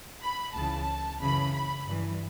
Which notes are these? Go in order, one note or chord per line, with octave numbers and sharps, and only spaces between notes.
B5
C#2 C#3 E3 A5
F#2 C#3 E3 B5
B5
G2 E3